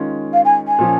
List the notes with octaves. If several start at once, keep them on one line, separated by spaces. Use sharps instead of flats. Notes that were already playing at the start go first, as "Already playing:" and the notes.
Already playing: D#3 G#3 C#4 F4
F5
G#5
G#5
A#2 F3 C#4